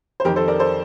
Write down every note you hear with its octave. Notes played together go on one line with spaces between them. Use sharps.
C5
F2 D#3 G4 A#4
A4 C5
A#4 D5
A4 C5